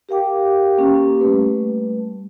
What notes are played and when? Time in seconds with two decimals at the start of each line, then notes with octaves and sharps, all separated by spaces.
0.09 G4 A#4 F5 G5 D6
0.78 A#3 C#4 G4
1.20 G3 A3 B4